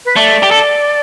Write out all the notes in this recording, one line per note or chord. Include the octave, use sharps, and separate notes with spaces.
B4
A3 D5
G4
A4